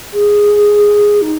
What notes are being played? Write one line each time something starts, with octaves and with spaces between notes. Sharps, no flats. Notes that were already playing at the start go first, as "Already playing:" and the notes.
G#4
D#4